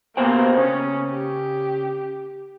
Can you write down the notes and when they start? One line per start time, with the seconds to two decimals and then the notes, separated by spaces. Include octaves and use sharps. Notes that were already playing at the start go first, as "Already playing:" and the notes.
0.17 B2 A#3 C5 G5
0.58 C#3 C#4
1.12 G4